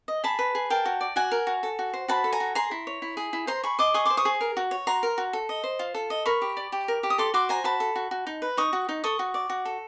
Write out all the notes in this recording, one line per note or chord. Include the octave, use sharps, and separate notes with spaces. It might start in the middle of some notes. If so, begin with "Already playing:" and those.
D#5
G#4 A5 B5
B4
G#4
A#4 G5 A5
F#4
D5
F#4 F#5 G#5
A#4
F#4
A4
F#4
C5
F#4 A5 B5
A4
G#5 A#5
F#4
G#4 A#5 C6
E4
C#5
E4
G#4
E4
C5 A#5 C6
G#4 B5 C#6
D#5 C6 D6
G#4 C#6 D#6
C5 C6 D6
C#6 D#6
G#4
A#4
F#4
C#5
F#4 A#5 C6
A#4
F#4
A4
D#5
C5
F4
A4
D#5
A#4 B5 C#6
G4
D5
G4
A#4
G4
D#6
A4 C6 D6
F#4 C6 D6
C5 G#5 A#5
F#4 A5 B5
A4
F#4
F#4
D#4
B4
D#4 C#6 D#6
F#4
D#4
A4 C#6 D#6
F#4
D5
F#4
A4